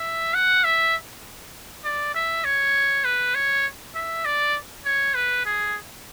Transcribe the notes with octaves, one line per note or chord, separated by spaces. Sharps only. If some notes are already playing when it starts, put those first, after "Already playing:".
Already playing: E5
F#5
E5
D5
E5
C#5
B4
C#5
E5
D5
C#5
B4
G#4